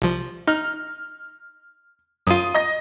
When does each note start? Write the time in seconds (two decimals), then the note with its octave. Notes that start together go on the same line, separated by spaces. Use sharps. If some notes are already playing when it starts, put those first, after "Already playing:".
0.02 C2 F3
0.48 D#4 F6
2.27 F#2 F4 D#6 D#7
2.54 D#5 A#6